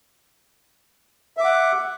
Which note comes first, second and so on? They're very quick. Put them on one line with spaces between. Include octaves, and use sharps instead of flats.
E5 D6 F#5